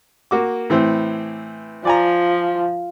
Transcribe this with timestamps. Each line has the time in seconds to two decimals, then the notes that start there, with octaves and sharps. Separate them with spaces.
0.31 A#3 F#4 D6
0.70 A2 E3 C4
1.85 F3 D5 G#5 A#5